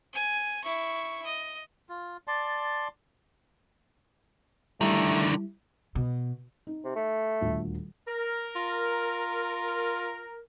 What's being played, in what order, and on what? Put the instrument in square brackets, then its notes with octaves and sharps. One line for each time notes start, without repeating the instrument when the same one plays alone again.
[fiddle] G#5
E4 C#6
D#5
[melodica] F4
D5 A5 C6
[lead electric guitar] D3 D#3 [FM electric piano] G3 E4 [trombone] A3
[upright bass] B2
[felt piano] D#4
[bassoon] C3
A3
[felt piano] D#1 D2 F4
[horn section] A#4
[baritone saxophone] F4